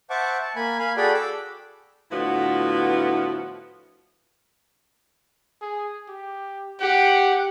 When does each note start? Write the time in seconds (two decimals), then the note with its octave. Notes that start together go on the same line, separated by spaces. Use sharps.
0.10 C5 E5 F#5 A5 C#6 D6
0.42 A5
0.56 A#3 G#5 B5
0.79 F5 G#5 B5
0.97 F#4 G#4 A4 D5 G5 B5
1.14 D6 E6
2.11 A2 D3 F3 B3 E4 F#4
5.61 G#4
6.08 G4
6.80 G4 F#5